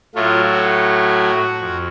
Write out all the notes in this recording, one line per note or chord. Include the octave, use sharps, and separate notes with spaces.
A2 F#3 A3 F4
F#4
F2